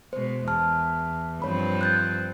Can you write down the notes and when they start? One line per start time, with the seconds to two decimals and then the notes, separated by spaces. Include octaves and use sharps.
0.13 B2 G#3 C5
0.48 E2 A5 F6
1.42 G2 F3 C4 C#5 B5
1.81 F#6 G6 A6